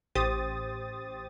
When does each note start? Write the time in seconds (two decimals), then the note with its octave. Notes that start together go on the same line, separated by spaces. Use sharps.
0.15 A1 G4 C5 D#6 A6